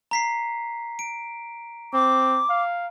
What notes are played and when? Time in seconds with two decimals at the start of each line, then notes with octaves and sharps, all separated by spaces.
0.11 A#5 B6 C7
0.99 D7
1.94 C4 D6
2.49 F5